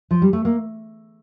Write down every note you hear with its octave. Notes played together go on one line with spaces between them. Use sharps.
F3
G3
A3
A#3